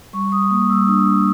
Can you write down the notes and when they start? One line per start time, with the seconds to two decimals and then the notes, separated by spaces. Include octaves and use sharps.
0.13 G3 C#6
0.31 G3 D#6
0.50 A#3 D#6
0.69 G3 E6
0.88 D4 D#6
1.06 D4